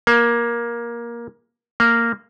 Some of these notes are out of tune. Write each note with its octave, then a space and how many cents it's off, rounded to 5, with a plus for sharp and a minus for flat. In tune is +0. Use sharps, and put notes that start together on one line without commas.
A#3 +15
A#3 -10